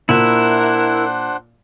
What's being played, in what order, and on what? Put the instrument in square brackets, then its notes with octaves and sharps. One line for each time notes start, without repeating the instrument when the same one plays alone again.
[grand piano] A#2 [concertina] D4 C5 F#5 [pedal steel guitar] E4 E5 [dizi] A#4